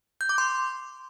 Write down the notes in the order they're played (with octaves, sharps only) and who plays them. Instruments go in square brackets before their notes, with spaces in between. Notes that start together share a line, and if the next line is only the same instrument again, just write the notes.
[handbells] G6
D6
C6